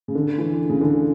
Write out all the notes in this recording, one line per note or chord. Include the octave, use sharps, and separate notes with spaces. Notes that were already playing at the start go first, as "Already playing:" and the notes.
C#3
D3
E3
C#3
D3